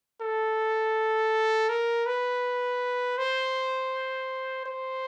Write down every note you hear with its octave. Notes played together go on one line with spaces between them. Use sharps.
A4
A#4
B4
C5
C5